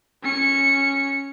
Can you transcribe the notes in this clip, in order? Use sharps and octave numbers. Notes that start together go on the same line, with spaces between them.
C#4 C#7